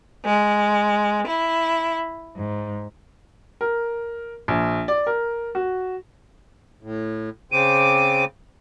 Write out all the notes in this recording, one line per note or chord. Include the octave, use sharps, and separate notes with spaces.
G#3
E4
G#2
A#4
A#1
D5
A#4
F#4
A2
C#3 C4 D6 D#7